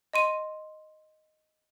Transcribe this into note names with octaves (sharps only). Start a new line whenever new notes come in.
D#5 C6 D#7